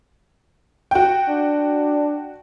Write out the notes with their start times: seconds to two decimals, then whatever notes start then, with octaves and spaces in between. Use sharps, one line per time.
0.91 F#4 G5
1.28 D4